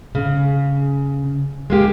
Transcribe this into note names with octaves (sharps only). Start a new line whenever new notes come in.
C#3
G#3 A#3 G4